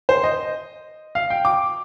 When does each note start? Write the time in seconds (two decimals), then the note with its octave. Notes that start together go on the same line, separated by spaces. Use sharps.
0.09 C5
0.24 D#5
1.15 F5
1.30 G5
1.45 D6